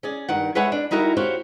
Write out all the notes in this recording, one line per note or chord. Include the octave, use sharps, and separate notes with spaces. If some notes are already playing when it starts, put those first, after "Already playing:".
C#4 G#4 D5
G2 D#3 F#5
G#3 B4 C#5 E5 F#5 G#5
D4
G3 D#4 E4 F#4 A#4
F#4 G4 C5 C#5 F5